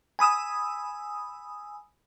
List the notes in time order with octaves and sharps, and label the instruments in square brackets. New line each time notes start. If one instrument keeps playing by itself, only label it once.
[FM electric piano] G#5 B5 D#6 E6